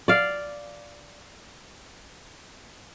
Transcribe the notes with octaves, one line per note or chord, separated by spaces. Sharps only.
D5 F5